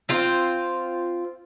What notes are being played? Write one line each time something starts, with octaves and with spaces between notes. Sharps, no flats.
C4 F4 C5